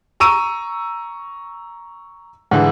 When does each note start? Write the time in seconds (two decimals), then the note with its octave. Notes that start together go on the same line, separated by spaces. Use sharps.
0.20 A#5 C#6 E6 D#7
2.51 G#2 D3 E3